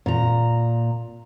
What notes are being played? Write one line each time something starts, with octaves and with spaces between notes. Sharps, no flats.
A#2 A#5